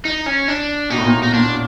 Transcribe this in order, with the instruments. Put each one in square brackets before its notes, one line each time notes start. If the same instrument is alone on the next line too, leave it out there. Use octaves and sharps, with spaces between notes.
[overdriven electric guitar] D#4
C#4
D4
[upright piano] B2 [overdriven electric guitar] D#4
[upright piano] A2
A#2
[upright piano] B2 [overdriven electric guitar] D#4
[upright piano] A#2 [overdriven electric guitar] D4